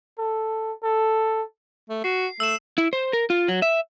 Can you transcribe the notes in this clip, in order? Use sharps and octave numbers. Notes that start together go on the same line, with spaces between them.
A4
A4
A3
F#4 C7
A3 E6 E7
E4
C5
A#4
F4
F#3
E5